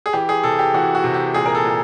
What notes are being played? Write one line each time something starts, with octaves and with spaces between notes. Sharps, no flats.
G#4
E3 G4
G#4
C3 A4
G4
E3 F#4
F#4
C3
G4
A#2 G#4
A#4
A4
A#2